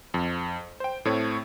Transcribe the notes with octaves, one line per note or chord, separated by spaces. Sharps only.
F2
C5 G5
A2 A3 C4 C#5